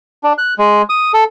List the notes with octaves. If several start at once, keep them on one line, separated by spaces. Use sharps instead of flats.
D4
F#6
G#3
D#6
A4